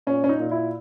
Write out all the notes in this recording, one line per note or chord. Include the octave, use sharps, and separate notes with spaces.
A#2 C#4
C#4
D#4
A#2
E4